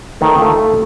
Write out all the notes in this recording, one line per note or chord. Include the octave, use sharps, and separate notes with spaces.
D#3 A3
A3 F4